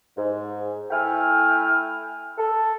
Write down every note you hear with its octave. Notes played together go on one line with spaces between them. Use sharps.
G#2
A3 E4 G5 G#5 F6
A4